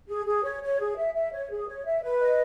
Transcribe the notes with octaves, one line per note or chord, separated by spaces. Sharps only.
G#4
G#4
C#5
C#5
G#4
E5
E5
C#5
G#4
C#5
E5
B4
D#5